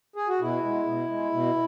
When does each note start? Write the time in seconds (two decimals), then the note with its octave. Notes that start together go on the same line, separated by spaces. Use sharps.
0.16 G#4
0.28 F#4
0.41 B2 E4
0.64 G#3
0.87 B2
1.09 G#3
1.32 B2